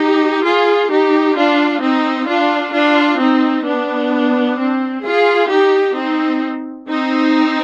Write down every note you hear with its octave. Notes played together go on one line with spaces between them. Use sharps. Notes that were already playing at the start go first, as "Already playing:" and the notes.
Already playing: D#4 G4
F4 G#4
D#4 G4
D4 F4
C4 D#4
D4 F4
D4 F4
C4 D#4
B3 D4
C4
F4 G#4
D#4 G4
C4 D#4
C4 D#4